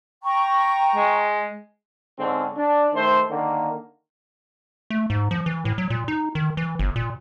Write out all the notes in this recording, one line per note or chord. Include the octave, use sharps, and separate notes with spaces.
G5 A#5 C#6
G#3
G#2 D3 C4 C#4
D4
D#3 A3 C5
D3 D#3 A#3
A3
G#2
F3
E3
A2
F#3
A#2
D#4
D#3
E3
G1
A#2